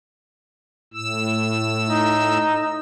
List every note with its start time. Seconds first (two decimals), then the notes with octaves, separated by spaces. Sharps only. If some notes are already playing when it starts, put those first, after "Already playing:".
0.94 A2 E6
1.89 D#4